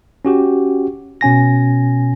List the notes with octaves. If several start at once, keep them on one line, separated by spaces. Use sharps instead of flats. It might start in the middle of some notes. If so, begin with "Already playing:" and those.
C#4 F#4 G4
B2 C#4 G#5 A#6